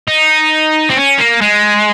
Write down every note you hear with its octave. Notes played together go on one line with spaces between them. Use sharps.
D#4
C4
C#4
A#3
G#3